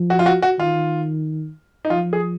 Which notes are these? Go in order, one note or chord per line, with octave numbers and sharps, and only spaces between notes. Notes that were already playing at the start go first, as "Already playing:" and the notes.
Already playing: F3
F#4
F4
F#4
F#4
D#3 F4
D#4
F3 F4
G#4